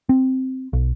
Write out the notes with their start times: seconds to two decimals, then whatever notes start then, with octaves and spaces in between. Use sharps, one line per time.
0.09 C4
0.73 B1